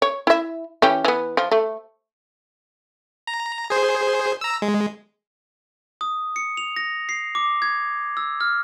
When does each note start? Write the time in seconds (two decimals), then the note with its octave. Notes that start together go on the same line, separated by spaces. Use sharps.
0.02 C#5
0.27 E4 E5
0.82 E3 C#4 G4
1.04 E3 B3
1.37 F3
1.51 A3
3.27 A#5
3.70 G#4 C5
4.41 A#5 E6
4.62 G#3
6.01 D#6
6.36 C#7
6.57 F7
6.76 A#6
7.09 C7
7.35 D6
7.62 G#6
8.17 E6
8.41 F6